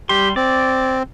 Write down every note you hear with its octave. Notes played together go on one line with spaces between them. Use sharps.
G3 G4 C6
C4 D5